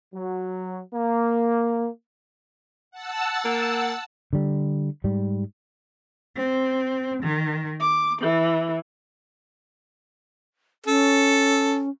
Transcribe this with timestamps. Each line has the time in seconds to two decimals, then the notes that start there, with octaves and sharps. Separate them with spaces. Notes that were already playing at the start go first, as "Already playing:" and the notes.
0.14 F#3
0.93 A#3
2.91 F#5 A5 E6
3.45 A#3
4.33 D3 G3
5.04 G#2 G3
6.36 C4
7.23 D#3
7.80 D6
8.23 E3
10.86 C#4 A4